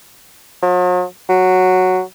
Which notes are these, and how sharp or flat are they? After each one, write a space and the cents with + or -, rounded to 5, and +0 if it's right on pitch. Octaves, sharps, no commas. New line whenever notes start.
F#3 -45
F#3 -5